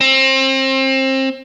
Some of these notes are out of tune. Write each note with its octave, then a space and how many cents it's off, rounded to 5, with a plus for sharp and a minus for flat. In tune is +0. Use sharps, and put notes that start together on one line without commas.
C4 +30